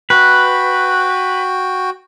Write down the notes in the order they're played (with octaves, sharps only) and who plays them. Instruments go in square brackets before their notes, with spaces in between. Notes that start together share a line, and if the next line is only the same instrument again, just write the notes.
[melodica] F#4 G5 [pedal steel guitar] B4